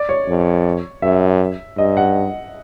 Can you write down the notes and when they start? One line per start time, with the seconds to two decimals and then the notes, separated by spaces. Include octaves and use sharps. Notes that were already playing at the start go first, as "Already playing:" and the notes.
Already playing: D5
0.09 C#5
0.27 F2
1.02 F#2 E5
1.77 G2 D#5
1.97 F#5